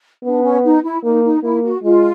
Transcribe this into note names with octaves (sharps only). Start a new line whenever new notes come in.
B3 D4
C#4
D#4
E4
A#3 D#4
D#4
A#3 E4
F#4
G#3 F4